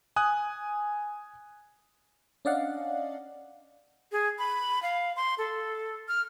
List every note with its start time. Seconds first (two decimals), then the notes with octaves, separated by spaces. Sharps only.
0.16 G#5 D#6 F#6
2.45 C#4 D4 D5 D#5 F5 F#5
4.12 G#4
4.39 B5
4.83 F5
5.16 C6
5.38 A4
6.08 F6